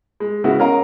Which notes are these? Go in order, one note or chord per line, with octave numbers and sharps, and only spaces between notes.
G#3
C#3 G#3 B3 E4 F#4
C#4 A#4 D#5 F5 A#5